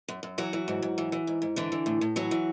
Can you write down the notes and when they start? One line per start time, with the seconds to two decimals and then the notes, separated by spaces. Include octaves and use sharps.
0.08 F#2
0.23 F#2
0.38 E3 F#3 F#4
0.53 E3
0.68 G#2
0.82 G#2
0.98 E3
1.12 E3
1.27 G#2
1.42 G#2
1.56 D3 E3 D4
1.72 E3
1.86 A2
2.01 A2
2.16 E3 F#3 F#4
2.31 E3